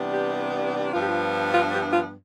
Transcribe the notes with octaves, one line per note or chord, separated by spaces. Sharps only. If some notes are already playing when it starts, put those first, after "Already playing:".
Already playing: C3 E3 G3 B3 D4
G4
G2 F3 B3 D4 F4
G4
F4
F4
G4
F4